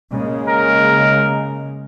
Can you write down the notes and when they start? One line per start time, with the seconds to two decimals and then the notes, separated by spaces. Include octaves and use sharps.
0.12 C#3 G#3 A#3
0.48 A#4